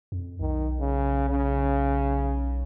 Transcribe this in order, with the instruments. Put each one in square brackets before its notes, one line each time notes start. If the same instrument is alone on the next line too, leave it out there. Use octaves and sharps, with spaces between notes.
[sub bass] F2
[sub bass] B1 [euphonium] D#3
[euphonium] C#3
C#3